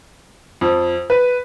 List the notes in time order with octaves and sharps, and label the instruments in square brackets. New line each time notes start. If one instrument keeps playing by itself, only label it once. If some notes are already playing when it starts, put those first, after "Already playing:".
[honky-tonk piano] F2
B4